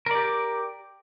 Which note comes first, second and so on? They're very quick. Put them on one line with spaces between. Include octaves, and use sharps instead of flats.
A#4 D5 G4